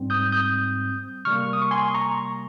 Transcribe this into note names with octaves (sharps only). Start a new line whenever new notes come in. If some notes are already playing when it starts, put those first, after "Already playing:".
Already playing: G#2 G3 C4
D#6 G6
D#6 G6
C3 G3 A#3 C#6 F6
D#6
C#6
G#5 C6
A#5 C#6